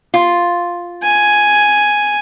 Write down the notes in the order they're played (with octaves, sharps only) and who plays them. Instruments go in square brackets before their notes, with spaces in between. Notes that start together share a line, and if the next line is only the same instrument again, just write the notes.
[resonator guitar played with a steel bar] F4
[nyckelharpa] G#5